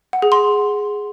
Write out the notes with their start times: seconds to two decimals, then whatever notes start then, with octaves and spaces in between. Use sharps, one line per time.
0.13 F#5
0.22 G#4
0.32 C6